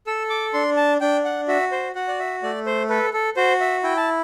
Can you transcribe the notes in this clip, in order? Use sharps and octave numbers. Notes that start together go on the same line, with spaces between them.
A4 E6
D6
D4 C6
A5
D4 G5
F#5
F#4 E5
C5
F#4 F#5
D5
E5
A3 D5
C5
A4 B4
A4
F#4 C5
E5
E4 G5
A5